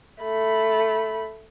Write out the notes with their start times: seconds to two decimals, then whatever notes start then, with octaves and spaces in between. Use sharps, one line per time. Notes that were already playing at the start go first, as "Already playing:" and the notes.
0.22 A3 B5